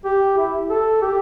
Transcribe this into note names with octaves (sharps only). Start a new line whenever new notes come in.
G4
E4
A4
G4